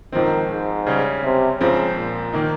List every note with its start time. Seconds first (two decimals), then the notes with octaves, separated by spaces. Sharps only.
0.12 G#2 D#3 F3 C4
0.50 G#2
0.87 C#3 G3 C#4
1.23 C3
1.60 G#2 C#3 F3 C4
1.96 A#2
2.33 D#3 A#3 D#4